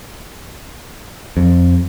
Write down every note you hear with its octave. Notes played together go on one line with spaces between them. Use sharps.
F2